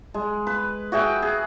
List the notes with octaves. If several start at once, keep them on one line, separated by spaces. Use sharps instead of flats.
G#3
B4
F#4 G#4 E5 G5
G#4